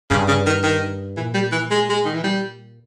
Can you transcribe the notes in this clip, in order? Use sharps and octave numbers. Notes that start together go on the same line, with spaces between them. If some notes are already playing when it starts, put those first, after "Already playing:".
G2 C#3
C#3
D#3
D#3
A#2 E3
G3
E3
G#3
G#3
D#3
E3
G3